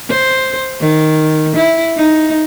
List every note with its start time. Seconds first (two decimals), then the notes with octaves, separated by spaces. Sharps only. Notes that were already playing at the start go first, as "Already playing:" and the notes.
0.11 C5
0.81 D#3
1.57 E4
1.97 D#4